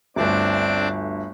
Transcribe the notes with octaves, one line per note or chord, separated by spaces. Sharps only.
G1 D2 C4 D4 D6